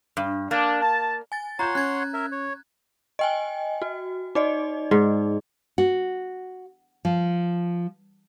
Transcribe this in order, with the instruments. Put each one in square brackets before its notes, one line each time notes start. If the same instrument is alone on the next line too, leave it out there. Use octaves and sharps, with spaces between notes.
[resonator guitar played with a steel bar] G2
[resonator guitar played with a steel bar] A#3 [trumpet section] D4
[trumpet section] A5
[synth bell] G#5 A6
[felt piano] F4 G6 E7 [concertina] C#5 F#5 C6 [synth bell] A#5
[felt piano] C#4 [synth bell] F#6 G#6
[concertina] A#4 E5
C#5
[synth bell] D#5 G5 G#5
F#4
D#4 D5 D#5
[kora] G#2
[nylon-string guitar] F#4
F3